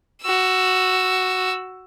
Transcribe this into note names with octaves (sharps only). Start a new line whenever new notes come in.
F#4 E6